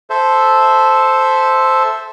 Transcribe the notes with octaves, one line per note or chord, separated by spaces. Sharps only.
A4 C5 E5